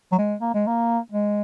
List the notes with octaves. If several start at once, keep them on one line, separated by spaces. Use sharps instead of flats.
F#3
G#3
A#3
G#3
A#3
G#3